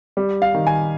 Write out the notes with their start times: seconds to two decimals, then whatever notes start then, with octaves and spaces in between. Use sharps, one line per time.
0.17 G3
0.42 F5
0.54 D#3
0.67 G#5